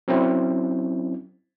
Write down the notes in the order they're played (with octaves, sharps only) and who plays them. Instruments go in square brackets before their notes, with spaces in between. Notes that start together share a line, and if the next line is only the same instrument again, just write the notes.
[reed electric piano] F#3 C4 C#4 E4